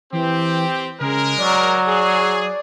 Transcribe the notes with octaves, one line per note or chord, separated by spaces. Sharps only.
E3 C4 G4
C#3 G#3 A#4
F#3 D5
G#4